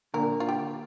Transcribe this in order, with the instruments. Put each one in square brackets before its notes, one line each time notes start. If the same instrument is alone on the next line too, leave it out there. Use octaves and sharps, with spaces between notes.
[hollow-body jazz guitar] A#2 D3 [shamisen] A#4
[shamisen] F4
G4